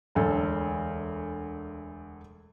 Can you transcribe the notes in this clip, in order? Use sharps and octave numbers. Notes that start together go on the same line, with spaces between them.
E1 D2 A4